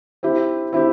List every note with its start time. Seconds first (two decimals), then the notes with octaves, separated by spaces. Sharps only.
0.23 C4 E4 G4
0.73 C4 E4 G4